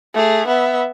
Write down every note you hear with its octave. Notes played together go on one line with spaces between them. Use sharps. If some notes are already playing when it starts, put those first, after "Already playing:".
A3 G#4
B3 E5